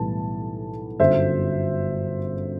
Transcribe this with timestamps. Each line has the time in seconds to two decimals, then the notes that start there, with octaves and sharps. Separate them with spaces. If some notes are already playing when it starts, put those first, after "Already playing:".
Already playing: B1 A2 E3 G3 B3 A5
1.00 G1 F#2 D3 F#3 C5 E5